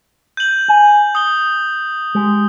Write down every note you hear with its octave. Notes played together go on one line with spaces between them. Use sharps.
G6 F#7
G#5
D#6 G7
G#3 G4